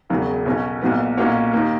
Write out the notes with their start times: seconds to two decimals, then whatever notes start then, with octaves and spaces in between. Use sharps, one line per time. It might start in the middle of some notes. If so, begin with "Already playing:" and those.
0.10 E1 E2 C#3 F#3
0.45 B1 B2 F#3 C#4
0.81 B1 A#2 F#3 B3
1.17 B1 A#2 A#3 C#4 F#4
1.53 D#2 D#3 A#3